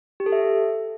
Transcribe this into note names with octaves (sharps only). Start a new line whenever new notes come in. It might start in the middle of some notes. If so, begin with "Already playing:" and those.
G4
A4
E5